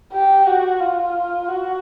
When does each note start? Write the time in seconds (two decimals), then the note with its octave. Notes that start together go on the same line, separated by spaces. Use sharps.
0.13 G4
0.47 F#4
0.81 F4
1.48 F#4